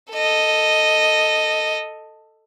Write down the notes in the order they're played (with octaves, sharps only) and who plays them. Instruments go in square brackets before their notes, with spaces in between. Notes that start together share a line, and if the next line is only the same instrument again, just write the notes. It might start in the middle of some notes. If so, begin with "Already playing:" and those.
[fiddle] A4 D#5